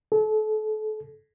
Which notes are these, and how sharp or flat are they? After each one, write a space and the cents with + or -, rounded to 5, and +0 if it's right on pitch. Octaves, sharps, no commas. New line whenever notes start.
A4 -35